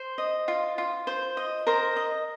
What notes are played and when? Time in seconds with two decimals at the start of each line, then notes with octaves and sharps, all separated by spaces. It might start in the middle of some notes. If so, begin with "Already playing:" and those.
Already playing: C5 C6
0.18 D#5
0.48 F4
0.78 F4
1.07 C5
1.37 D#5
1.67 A#4 C5 A#5
1.96 D#5